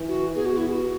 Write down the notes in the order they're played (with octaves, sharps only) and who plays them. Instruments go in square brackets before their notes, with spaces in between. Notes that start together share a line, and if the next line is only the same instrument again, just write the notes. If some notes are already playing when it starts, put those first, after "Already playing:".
Already playing: [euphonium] E3
[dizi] F#4
[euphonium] B3 [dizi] G#4
[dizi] F#4
E4
G#4
F#4